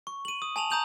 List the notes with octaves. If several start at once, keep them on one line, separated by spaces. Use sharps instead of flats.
C#6
D#7 F#7
D#6
G#5 A5 F7 F#7
A#5 D#6 G6 F7 F#7